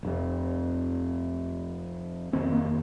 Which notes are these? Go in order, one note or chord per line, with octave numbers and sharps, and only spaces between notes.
F1 F2 C3
F1 D#2 C4
A#3